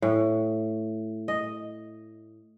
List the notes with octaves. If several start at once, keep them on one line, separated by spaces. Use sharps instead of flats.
A2
D#5